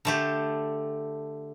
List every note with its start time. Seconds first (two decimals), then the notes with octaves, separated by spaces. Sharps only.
0.05 D3 A3 G4